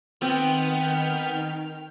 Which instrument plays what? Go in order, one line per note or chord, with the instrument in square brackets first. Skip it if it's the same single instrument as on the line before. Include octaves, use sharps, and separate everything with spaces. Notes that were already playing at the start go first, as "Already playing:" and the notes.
[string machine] D#3 [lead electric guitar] B3 [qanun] C4 [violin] G5 F6